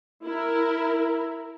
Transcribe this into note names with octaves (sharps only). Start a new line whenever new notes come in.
E4 A#4